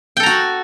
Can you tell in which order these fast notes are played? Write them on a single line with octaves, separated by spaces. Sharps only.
G5 A4 A#5 F#4